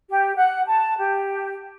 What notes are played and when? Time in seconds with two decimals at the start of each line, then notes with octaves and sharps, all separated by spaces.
0.09 G4
0.36 F#5
0.66 A5
0.98 G4